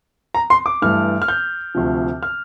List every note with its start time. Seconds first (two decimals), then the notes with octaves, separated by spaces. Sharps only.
0.35 A#5
0.50 C6
0.66 D6
0.82 G2 E3 A3 F6
1.22 F6
1.28 G6
1.75 D2 C3 F3
2.23 F6